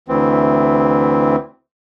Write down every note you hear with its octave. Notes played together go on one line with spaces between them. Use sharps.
D2 E3 C4